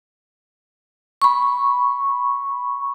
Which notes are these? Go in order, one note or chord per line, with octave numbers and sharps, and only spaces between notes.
B5 C#6